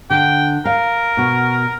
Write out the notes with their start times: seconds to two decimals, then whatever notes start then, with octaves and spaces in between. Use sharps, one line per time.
0.10 D3 G5
0.65 A#4 F5
1.17 B2 F#4